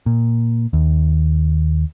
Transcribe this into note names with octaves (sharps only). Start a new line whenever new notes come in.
A#2
D#2